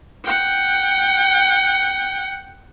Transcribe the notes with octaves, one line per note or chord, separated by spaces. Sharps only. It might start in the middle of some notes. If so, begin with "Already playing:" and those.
F#5 G5